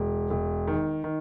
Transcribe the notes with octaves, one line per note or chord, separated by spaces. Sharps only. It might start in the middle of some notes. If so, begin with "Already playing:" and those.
Already playing: E1
E1
D#3
D#3